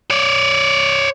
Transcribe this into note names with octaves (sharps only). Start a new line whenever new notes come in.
C#5 D5